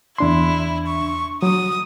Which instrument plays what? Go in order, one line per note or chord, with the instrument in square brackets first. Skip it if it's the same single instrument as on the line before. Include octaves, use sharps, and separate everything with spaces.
[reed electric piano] E2 D4 C6 [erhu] E4
[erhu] C#6
[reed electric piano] F#3 [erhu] D#6